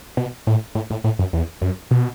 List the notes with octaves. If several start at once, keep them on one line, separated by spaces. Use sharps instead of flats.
B2
A2
A2
A2
A2
F#2
E2
F#2
B2